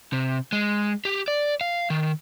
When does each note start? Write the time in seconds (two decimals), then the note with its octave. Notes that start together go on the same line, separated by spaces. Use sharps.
0.13 C3
0.52 G#3
1.05 G4
1.28 D5
1.61 F5
1.90 D#3